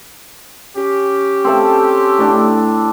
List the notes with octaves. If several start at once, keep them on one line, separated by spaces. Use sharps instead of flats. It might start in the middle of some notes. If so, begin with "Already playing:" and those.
C#4 G4
C4 A4 E5
A2 D4